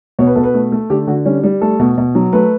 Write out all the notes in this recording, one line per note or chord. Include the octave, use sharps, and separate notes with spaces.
B2 C#5
B4
B2 A4
B4
A3
A3
D3 G4
D3 F#4
G3 C#4
G3
A3 A4
B2
B2
F#3
A3 B4